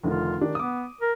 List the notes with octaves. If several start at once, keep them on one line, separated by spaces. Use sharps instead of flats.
F1 D3 D#3 F4
D#3 D4 G4
B3 D6 D#6
A#4